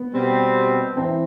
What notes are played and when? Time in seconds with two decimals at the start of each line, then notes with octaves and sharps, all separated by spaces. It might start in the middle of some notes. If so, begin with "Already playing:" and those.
Already playing: B3
0.13 B2 G3 C4
0.96 E3 C4